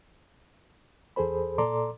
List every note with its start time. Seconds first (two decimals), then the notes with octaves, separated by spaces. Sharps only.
1.16 E2 G#4 A4 C5 B5
1.58 A#2 A4 D5 A#5 C6 D6